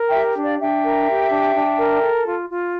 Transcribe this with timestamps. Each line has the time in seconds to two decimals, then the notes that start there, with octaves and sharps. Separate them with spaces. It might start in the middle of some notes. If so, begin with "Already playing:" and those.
Already playing: A#4
0.08 E5 G5
0.13 G4
0.37 D4
0.43 D5 F5
0.60 D4 E5 G5
0.84 A#4
1.08 G4
1.31 D4
1.55 D4
1.78 A#4
2.01 A4
2.25 F4
2.49 F4